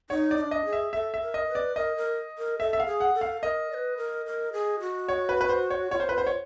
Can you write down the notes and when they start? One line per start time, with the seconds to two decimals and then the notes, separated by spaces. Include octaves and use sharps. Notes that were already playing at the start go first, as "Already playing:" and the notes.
0.10 D#4 C#5
0.31 D5
0.37 D#4
0.41 D4
0.51 D#5
0.65 G#4
0.73 E5
0.93 A4 E5
1.14 E5
1.21 A#4
1.34 D#5
1.48 B4
1.55 D5
1.76 A#4 D#5
1.96 A#4
2.38 A#4
2.59 A4 E5
2.73 E5
2.80 F5
2.86 G#4
3.00 F#5
3.14 A4
3.21 F5
3.42 A#4 D#5
3.70 D5
3.74 B4
3.97 A#4
4.26 A#4
4.53 G#4
4.80 F#4
5.08 C#5
5.29 B4
5.41 B4
5.49 C5
5.70 C#5
5.91 F4 C#5
6.00 C5
6.09 B4
6.18 C5
6.27 C#5